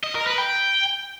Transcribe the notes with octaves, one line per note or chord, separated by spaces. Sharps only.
D#5
A#4
B4
G5